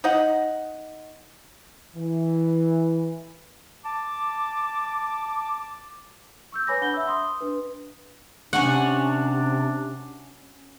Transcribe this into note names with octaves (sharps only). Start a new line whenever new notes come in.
D#4 D#5 F#5
E3
A5 D6
C#6 E6 G6
B4 C#5 G#5 B5 D6 A#6
D4 F#5 B5 G6 G7
E5 E6
C6 D#6
D4 B4
C3 C#4 D4 F#4 F#5